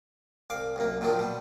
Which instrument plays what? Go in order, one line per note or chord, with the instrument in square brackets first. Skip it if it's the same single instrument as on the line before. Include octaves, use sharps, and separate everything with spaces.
[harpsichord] C2 F5 D6
C2 F#2 A#3
A#2 D#3 F3 F#3 D4
B2 G3